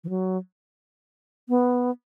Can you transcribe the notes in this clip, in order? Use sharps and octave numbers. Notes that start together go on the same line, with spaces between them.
E3
F#3
B3